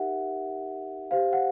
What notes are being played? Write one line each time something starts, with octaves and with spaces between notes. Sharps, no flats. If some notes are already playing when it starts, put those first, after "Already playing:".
Already playing: D#4 G4 A#4 E5 F#5
G4 C5 F5
F#5